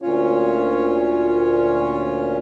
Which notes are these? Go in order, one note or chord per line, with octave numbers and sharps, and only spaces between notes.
D2 A#2 C#4 F4 C#5